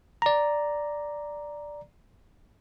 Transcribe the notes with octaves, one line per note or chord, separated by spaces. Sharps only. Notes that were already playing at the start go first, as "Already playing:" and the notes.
D5 A#5